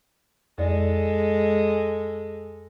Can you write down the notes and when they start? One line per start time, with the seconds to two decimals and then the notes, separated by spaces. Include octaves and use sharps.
0.58 F2 G#3 A4 D5